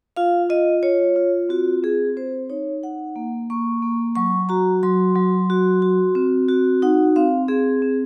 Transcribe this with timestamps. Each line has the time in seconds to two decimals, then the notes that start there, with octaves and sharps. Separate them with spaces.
0.17 F4 F5
0.50 F4 D#5
0.83 F4 C#5
1.16 F4
1.49 C4 F#4
1.83 C4 G#4
2.17 C4 C5
2.50 D#4 C#5
2.83 D#4 F#5
3.16 A#3
3.50 A#3 C#6
3.82 A#3
4.16 F#3 C#6
4.49 F#4 A#5
4.83 F#3 C6
5.15 F#3
5.50 F#4
5.82 F#4
6.15 C4
6.49 F#4
6.82 D#4 F#5
7.16 C4 F5
7.48 C4 G#4
7.82 C4